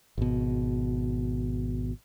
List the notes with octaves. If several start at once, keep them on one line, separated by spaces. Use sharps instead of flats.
G#1 B2